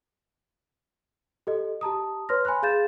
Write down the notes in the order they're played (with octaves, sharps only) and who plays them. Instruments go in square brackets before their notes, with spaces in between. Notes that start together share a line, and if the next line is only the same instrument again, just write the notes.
[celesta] G4 A4 D#5
G4 A5 A#5 D#6
B4 C#5 C6 F6 A#6
G#5 B5 C6 F#6
G#4 F5 G6 A6 E7